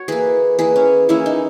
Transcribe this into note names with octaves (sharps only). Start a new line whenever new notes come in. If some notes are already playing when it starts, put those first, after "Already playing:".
Already playing: F#4 C#5
E3 A#3 G#4 B4
E3 A#3 G#4 B4
C#4
E3 A#3 C#4 E4
D#4